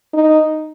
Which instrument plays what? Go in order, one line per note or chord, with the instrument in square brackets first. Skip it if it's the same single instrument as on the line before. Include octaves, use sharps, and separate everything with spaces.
[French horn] D#4